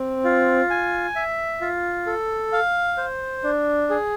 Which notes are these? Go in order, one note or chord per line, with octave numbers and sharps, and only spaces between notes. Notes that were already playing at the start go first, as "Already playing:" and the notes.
Already playing: C4
F4
G#5
E5
F4
A4
F5
C5
D4
G#4